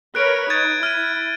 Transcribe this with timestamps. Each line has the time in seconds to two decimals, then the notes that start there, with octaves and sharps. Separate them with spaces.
0.15 A#4 B4 C#5 F#6 D7
0.50 D#4 G#6 A6 D#7
0.83 E4 F6 D#7